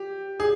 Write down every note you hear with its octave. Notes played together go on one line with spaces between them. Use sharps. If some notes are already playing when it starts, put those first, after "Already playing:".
Already playing: G4
G#4